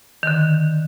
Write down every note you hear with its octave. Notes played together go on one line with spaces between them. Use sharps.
D3 D#3